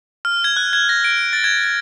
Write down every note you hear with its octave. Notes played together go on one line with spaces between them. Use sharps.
F6
G#6
F#6
G#6
A#6
D7
A6
G#6
G#6